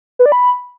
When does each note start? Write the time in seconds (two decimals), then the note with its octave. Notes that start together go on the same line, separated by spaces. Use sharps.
0.19 B4
0.26 D5
0.32 B5